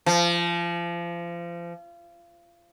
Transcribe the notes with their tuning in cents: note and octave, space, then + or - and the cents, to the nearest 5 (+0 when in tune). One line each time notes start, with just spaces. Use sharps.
F3 -30